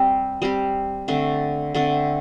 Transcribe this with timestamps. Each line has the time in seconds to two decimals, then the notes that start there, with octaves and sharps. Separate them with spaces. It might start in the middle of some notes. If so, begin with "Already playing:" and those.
Already playing: G3 C4 G4
0.42 G3 C4 G4
1.08 D3 A3 C4
1.74 D3 A3 C4